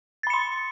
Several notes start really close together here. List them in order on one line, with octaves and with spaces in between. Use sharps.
A6 B5 C#7 C6